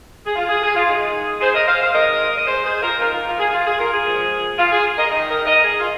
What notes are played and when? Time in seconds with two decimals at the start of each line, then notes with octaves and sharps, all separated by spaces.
0.26 G#4
0.36 F4
0.49 G#4
0.62 G#4
0.75 F4
0.88 D#3 G#3 D#4 G#4
1.41 G#4 C5
1.54 A#4 D#5
1.67 C5 F5
1.81 C5 F5
1.94 D#3 G#3 C4 A#4 D#5
2.36 D#5
2.47 G#4 C5
2.64 G#4 C5
2.82 F4 A#4
2.99 D#3 A#3 D#4 F4 A#4
3.12 F4 A#4
3.26 F4 A#4
3.39 G#4
3.52 F4
3.66 G#4
3.78 F4 A#4
3.92 G#4
4.05 A#2 F3 G#3
4.58 F4
4.71 G#4
4.98 A#4 D#5
5.11 D#3 G#3 D#4 A#4 D#5
5.28 A#4 D#5
5.46 A#4 D#5
5.64 G#4
5.80 F4